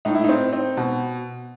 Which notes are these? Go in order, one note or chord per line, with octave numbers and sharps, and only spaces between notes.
A2 D#4
E4
D#4
C4
C4
B2